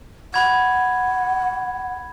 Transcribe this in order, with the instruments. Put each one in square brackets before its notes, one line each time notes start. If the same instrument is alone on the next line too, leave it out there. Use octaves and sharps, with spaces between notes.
[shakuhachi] F#5 [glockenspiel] B5 G#6